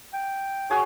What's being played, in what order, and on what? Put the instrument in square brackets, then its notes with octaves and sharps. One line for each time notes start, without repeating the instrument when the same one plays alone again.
[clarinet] G5
[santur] F#4 G#4 C#5